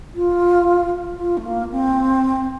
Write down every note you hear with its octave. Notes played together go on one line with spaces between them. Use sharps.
F4
F4
A3
A#3
C4